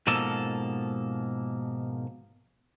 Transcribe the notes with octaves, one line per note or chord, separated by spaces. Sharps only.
G#2 B2 F3 A#3 A4